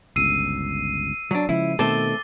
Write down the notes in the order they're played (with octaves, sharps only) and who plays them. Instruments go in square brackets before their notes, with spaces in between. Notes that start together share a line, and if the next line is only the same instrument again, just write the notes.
[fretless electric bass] G1 C#2 [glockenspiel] E6 [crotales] C7 D#7
[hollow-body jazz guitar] F#3 D4
[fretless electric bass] C#3 F3 G#3 [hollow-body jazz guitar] E4
[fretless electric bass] B2 D#3 [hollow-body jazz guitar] A3 C4 A4 [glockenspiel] D6 A6 G7